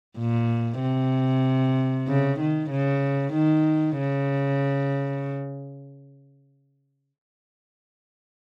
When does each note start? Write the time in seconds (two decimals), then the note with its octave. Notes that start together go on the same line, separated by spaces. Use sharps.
0.18 A#2
0.81 C3
2.07 C#3
2.40 D#3
2.71 C#3
3.34 D#3
3.98 C#3